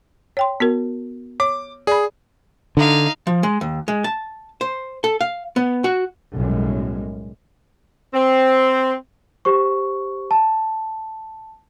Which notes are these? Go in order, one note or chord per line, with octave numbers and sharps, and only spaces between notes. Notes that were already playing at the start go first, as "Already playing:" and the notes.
C#5 G5 C6
B3 F#4 A#4
C#5 D6
G#4 D5 B5
D3 D#4 F5
F3
G#3
D#2
G#3
A5
C5
A4
F5
B3
F#4
B1 F#2 A2 G3 G#3
C4
G4 C5 C#6
A5